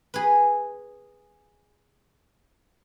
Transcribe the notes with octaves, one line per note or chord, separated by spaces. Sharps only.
G#4 B4